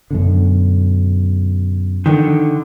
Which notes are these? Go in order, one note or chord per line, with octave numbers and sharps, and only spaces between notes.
F#2 B2 D3
D3 D#3